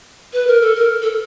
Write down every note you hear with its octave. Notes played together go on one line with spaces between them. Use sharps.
B4
A#4
A4
A#4
A4